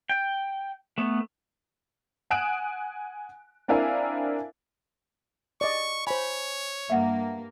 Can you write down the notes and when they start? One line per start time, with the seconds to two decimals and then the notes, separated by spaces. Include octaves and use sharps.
0.09 G5
0.98 A3 B3
2.30 F#5 G#5 D#6 F#6 D7 E7
3.68 C4 D4 E4 A#4 F5 G#5
5.61 D5 D#5 C#6
6.07 C5 C#5 G#5 B5
6.90 G2 A#3 E5 F#5